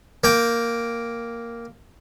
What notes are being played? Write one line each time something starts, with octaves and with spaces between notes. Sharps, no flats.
A#3 G5